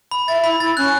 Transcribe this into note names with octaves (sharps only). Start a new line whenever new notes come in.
B5
E5 A6
E4 B5
E4 A6
C#4 F#6